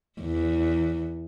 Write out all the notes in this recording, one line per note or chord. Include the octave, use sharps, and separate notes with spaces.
E2